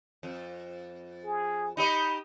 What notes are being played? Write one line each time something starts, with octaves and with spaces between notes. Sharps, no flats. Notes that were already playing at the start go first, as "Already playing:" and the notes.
F2
G#4
D#4 G4 D#5 B5